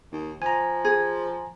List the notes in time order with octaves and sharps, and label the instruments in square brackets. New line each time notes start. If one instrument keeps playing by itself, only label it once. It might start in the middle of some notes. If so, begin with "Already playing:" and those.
[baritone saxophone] D#2
[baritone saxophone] F3 [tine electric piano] G#5 A#5
[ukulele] G#4